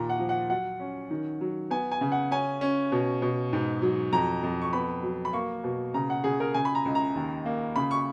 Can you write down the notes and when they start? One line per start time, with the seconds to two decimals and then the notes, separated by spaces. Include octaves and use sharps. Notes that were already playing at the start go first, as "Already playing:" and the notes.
Already playing: D#2 A#2 A#5
0.09 F#5
0.19 F3
0.29 F#5
0.50 F#3 F#5
0.80 C#4
1.10 D#3
1.41 F#3
1.70 B3 G#5
1.91 G#5
2.01 C#3
2.12 F#5
2.31 C#4 G#5
2.61 C#4
2.92 B2
3.22 B2
3.53 G#2
3.82 F#3
4.13 F2 A#5
4.43 F2
4.62 C#6
4.73 B3 B5
5.03 F#3
5.25 B5
5.33 A#3 C#6
5.64 B2
5.94 C#3 A#5
6.10 F#5
6.24 C#3 G#4
6.40 A#4
6.54 C#3 G#5
6.65 B5
6.75 A#5
6.85 C#2
6.95 A#5
7.15 D#2
7.45 A#3
7.76 C#3 B5
7.91 C#6